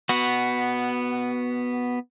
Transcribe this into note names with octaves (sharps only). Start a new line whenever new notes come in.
B3 F#4